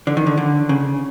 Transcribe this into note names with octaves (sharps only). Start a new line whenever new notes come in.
D3
D#3
D3
D3
C#3